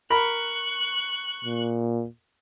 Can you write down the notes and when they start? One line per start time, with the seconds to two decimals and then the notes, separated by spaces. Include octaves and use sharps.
0.10 A#4 B5 C#6 F#6
1.44 A#2